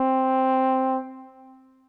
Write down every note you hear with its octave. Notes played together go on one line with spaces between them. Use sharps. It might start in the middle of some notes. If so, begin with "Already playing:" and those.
Already playing: C4